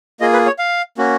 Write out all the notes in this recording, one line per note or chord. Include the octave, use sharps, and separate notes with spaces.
A#3 F4 G#4 D#5
B4
C#5
F5
A#3 C#4 F#4